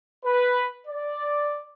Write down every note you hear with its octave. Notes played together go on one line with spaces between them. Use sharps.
B4
D5